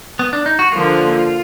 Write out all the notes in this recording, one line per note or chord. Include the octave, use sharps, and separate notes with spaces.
B3
D4
D#4
F#4
D3 F3 A#3 F4